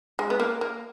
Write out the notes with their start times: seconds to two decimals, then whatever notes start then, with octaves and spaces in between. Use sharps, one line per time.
0.19 G#3
0.30 B3
0.40 A#3
0.61 A#3